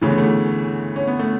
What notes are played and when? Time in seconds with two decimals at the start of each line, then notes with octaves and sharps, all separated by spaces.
0.01 D2 C#3 E3 A3
0.10 B3
0.18 A3
0.96 C#4
1.07 B3
1.19 A3